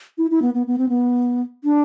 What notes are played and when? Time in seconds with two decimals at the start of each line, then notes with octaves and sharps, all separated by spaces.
0.18 E4
0.31 E4
0.42 B3
0.54 B3
0.67 B3
0.78 C4
0.89 B3
1.64 D4